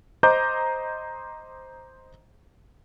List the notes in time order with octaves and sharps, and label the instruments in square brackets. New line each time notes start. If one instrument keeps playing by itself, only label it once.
[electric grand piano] C5 D#5 A#5 D6 G6